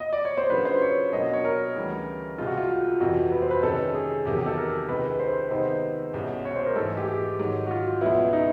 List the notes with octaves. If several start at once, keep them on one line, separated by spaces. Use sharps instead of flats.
D#5
D5
C#5
C5
C#3 F#3 A#3 D4 F4 B4
C5
C#5
B2 F#3 A#3 D4 D#5
D#5
C#5
A#4
D2 C#3 E3 G3
C2 C3 F3 G#3 F4
F#4
F4
F2 C3 E3 F#4
B4
C5
B4
C3 D#3 G#3 C#4 A4
G#4
E2 C3 D#3 F#3 A#3 G4
G4
A4
A#4
C#2 C3 D#3 G#3 B4
C5
C3 D#3 G#3 B3 D#4 C5
C2 B2 G#3 C#4 E4
C#5
C5
A#4
G#2 E3 A3 A4
G#4
G4
G4
G#2 D#3 F#3
F#4
F4
C#2 B2 F#3 B3 E4
D#4